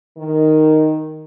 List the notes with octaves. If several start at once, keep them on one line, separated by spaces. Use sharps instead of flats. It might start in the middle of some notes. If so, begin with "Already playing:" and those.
D#3